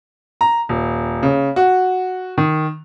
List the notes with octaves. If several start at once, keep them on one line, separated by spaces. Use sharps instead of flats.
A#5
D#1
C#3
F#4
D#3